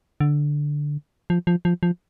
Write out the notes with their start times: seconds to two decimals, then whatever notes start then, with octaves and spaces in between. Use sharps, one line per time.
0.20 D3
1.30 F3
1.47 F3
1.65 F3
1.83 F3